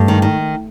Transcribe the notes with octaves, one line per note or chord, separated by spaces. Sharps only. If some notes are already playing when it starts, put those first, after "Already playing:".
Already playing: G2 A3
D#3
D#3